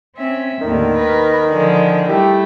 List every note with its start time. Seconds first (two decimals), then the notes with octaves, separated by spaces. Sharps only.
0.15 C4 C#4 E5
0.61 D#2 A2 D3 D#3
0.95 A#4 B4
1.49 D3 F3 G#3
2.09 G3 A3 E4 G4